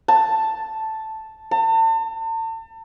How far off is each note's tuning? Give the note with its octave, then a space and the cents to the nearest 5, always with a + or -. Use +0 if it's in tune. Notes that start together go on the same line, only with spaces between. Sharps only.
A5 +0
A5 +40